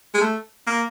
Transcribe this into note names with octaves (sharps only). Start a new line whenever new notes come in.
G#3
A3
A#3